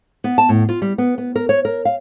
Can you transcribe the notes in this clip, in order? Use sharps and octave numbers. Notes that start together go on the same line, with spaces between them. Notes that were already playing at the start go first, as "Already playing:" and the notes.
B3
A5
A2
F4
G3
B3
B3
A#4
C#5
A#4
F5